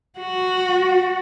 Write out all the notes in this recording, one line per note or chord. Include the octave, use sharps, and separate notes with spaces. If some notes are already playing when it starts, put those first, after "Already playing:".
F#4